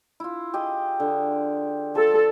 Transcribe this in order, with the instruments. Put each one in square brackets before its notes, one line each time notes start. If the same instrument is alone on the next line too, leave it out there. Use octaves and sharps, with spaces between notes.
[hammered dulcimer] E4 F4
G4 G#4 D#5
D3
[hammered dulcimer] F3 [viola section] A4